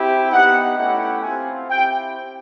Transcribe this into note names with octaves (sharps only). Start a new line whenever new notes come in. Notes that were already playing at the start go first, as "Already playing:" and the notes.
Already playing: C4 E4 G4
B3 D#4 G4 F#5
A3 C#4 E4 G4 F#5
C4 F4 G#5
C4 E4 G4 G5